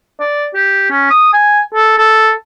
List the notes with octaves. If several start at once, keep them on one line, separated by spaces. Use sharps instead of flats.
D5
G4
C#4
D#6
G#5
A4
A4